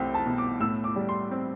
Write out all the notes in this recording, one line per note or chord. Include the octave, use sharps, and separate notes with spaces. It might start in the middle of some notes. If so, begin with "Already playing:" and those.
Already playing: C2 A3 C4 G5
A5
B2
D6
A2 E6
D6
G3
C6
C4